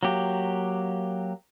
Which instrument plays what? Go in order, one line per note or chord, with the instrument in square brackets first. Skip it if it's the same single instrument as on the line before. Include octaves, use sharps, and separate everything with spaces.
[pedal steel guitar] F#3 A#3 G4